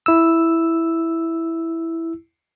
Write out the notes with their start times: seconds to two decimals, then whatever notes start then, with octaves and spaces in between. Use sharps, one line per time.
0.06 E4 E6